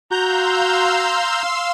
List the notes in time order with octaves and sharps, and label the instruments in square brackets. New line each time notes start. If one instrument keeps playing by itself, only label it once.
[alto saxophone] F#4 [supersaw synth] F5 C6 E6 [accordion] A#5 G6